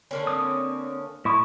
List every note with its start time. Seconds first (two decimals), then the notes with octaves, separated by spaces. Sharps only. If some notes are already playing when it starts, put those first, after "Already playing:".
0.11 D3 A#3 C#4
0.27 C4 D6 D#6
1.25 A2 E4